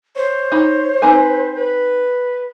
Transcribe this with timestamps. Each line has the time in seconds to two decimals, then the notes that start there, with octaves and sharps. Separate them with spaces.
0.16 C5 C#5
0.52 D#4 B5
1.02 C4 D#4 B4 G#5
1.57 B4